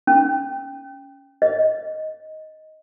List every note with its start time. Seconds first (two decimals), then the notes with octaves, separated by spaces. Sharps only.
0.07 C#4
1.42 D#5